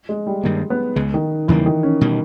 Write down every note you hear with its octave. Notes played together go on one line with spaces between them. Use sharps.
G#3
G3
G2 D#3 A#3
B3
C#2 C#3 G#3
D#3
E2 C#3 E3 G3 A#3
D#3
C#4
B2 G3